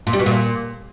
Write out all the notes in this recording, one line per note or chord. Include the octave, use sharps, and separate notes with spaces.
A#2
G3
B2
A#2